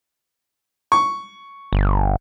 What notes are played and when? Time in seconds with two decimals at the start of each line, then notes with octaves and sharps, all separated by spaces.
0.92 C#6
1.73 G1